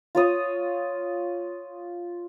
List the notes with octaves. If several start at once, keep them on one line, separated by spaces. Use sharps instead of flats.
F4 C#5 D#6